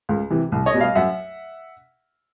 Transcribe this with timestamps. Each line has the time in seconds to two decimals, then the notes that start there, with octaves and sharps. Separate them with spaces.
0.09 C#2
0.30 C3 E3
0.52 C2
0.66 C#5 D#5
0.74 B2 G3
0.81 D#5 F5
0.95 F#2 E5 F#5